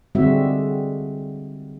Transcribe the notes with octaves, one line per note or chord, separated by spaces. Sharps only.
D3 G3 G#3 C4 F#4 E5